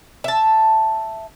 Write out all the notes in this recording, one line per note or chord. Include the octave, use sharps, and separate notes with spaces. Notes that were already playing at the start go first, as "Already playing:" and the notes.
E5 A5